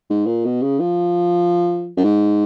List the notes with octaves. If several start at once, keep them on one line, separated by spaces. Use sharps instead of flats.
G#2
A#2
B2
C#3
F3
F#2
G#2